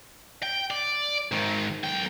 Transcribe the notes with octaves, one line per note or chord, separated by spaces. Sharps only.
G5
D5
G#2 D#3
B1 G5